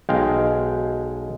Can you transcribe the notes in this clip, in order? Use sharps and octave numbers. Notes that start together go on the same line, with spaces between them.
B1 G#3 F5 G5